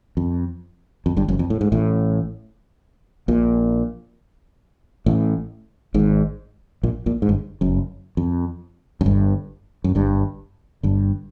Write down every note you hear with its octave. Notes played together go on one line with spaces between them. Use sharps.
F2
F2
G1 G2
F#1 F#2
F2
A2
G#2
A1 A2
A#1 A#2
A1 A2
G#1 G#2
A#1 A#2
A#1 A#2
G#2
G1 G2
F#1 F#2
F2
F#2
G1 G2
F#2
G1 G2
G1 G2